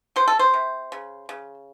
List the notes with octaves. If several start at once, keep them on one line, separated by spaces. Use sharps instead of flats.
F#3 C5
A4
C5
C3
C#3
C#3